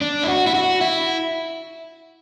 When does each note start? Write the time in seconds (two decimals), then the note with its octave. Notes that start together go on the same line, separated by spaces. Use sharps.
0.01 D4
0.23 E4
0.28 F#4
0.47 E4
0.55 F#4
0.81 E4